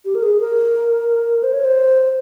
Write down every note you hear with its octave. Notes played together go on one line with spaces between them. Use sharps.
G4
A#4
G#4
A#4
C5
C#5
C5